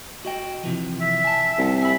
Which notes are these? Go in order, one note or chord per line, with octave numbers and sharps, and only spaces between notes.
F#4 D#5 G5
C3 E3 F3
E5
G#5 A5
C2
E5 G#5 B5